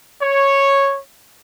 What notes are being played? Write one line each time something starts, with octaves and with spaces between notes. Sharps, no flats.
C#5